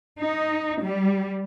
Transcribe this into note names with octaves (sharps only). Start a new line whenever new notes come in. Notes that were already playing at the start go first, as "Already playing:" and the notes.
D#4
G3